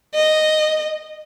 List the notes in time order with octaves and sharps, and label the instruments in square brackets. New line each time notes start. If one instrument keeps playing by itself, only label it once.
[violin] D#5